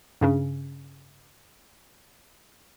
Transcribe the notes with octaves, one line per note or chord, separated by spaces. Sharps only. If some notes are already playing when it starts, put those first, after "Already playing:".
G2 C#3 C#4